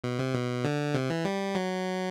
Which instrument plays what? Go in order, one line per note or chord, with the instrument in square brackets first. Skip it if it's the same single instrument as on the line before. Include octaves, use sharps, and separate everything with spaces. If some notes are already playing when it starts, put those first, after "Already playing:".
[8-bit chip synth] B2
C3
B2
D3
C3
E3
G3
F#3